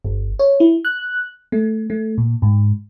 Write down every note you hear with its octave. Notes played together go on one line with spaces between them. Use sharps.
G1
C#5
E4
F#6
A3
A3
A#2
G#2